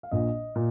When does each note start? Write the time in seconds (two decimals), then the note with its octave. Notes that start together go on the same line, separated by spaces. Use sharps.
0.03 F5
0.11 A#1 A#2 D#5
0.55 A#2